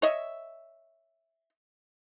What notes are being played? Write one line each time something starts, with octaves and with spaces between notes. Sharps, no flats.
C#5 D#5 E5